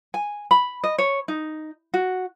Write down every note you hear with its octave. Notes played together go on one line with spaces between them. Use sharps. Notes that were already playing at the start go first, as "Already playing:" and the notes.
G#5
B5
D#5
C#5
D#4
F#4